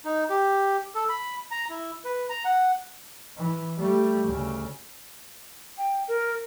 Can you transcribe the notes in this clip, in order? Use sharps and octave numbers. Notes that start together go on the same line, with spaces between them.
D#4
G4
A4
B5
A#5
E4
B4
A#5
F#5
E3
G3 A3
D2 C#3
G5
A#4